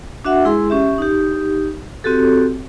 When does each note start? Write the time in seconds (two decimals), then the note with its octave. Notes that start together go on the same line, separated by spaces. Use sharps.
0.25 D4 F#4 E5 F#5
0.45 G#3 E4 G#4 C6
0.70 C#4 G4 E5
0.98 D#4 G4
2.04 C4 F#4 G4 A4